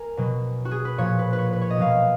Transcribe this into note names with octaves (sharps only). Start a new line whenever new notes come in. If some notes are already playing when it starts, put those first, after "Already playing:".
Already playing: A#4 G#5
B2 F#3
F#4
G#4
B4
A#2 F3 C#5
B4
B4
C#5
B4
C#5
D#5
B2 F#3 F5